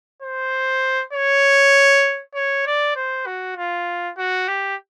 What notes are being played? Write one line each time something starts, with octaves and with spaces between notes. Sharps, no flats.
C5
C#5
C#5
D5
C5
F#4
F4
F#4
G4